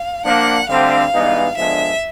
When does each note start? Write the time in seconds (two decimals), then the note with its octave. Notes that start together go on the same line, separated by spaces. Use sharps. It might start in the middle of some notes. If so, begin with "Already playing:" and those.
Already playing: F5
0.25 F3 A#3 D4 F#5
0.69 D2 D3 G3 C4 F5
1.13 G2 E3 G#3 B3 D#4
1.57 D3 F3 G#3 B3 D4 E5